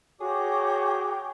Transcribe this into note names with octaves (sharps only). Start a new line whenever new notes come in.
F#4 G#4 C#5 G5 A#5 D6